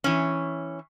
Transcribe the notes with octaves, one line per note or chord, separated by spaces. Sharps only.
E3 C#4